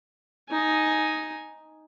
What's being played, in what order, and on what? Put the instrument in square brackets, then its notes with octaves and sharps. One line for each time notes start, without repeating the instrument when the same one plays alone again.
[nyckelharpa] D#4 G#5